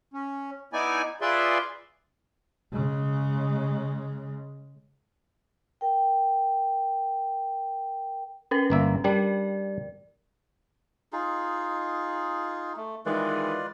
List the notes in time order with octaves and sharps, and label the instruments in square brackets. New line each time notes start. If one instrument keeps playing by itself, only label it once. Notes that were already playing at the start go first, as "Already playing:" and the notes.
[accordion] C#4
B3 D#4 E4 D5 G#5
F4 G#4 B4 D5 E5 C6
[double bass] C#3 G#3
[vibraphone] A#4 G5
[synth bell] C#4 A#4 B4
[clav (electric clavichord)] G1 A#3 E5
[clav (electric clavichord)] G3 D4 [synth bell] A#4 D5
[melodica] D#4 F4 G#4
A3
[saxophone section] D#3 E3 G#3 [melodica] F4 B4 D5